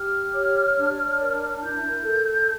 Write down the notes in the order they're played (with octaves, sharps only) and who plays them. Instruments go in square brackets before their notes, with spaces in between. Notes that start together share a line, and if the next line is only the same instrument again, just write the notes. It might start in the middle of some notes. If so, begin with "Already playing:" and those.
Already playing: [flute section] G4 F6
C#5
D4
A#4
E4 G6
A4